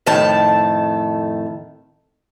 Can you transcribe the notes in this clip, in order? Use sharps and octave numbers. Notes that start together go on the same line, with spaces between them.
F2 A2 D#3 A4 A5